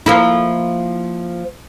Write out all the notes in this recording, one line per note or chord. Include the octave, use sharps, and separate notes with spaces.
F3 A#3 E4